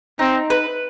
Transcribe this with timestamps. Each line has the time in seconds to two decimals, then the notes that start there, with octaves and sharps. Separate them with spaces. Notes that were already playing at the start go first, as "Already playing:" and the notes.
0.19 C4 D#4
0.50 B4